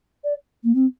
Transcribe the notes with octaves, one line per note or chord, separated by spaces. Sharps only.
D5
A#3
C4